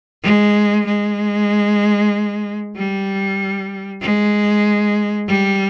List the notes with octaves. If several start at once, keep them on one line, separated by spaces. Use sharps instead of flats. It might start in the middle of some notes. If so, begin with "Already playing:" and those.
G#3
G#3
G3
G#3
G3